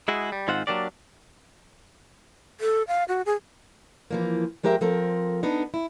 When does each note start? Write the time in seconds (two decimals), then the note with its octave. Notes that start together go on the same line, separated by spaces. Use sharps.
0.08 G#3 E4 F#4 G#4
0.32 G3
0.48 G#2 D#3 C4 F4 C5 F#5
0.67 F#3 G3 A#3 D4 G4 D5
2.60 A4
2.88 F5
3.08 F#4
3.26 G#4
4.11 E3 F3 A#3
4.63 F3 G#3 G4 A#4 D#5 E5
4.81 F3 C4 A4 A#4
5.43 B3 D4 D#4
5.74 E4